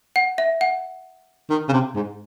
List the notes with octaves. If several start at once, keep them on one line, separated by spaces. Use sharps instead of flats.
F#5
E5
F#5
D#3
C#3
C3
G#2